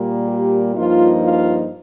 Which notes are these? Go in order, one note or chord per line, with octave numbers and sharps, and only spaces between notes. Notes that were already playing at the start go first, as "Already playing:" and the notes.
Already playing: A#2 G3 A#3
G4
G2 F3 A#3 D#4 F4
F4